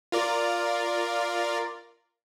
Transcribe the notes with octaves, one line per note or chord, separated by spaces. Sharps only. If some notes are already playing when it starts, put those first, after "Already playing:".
F4 A#4 D5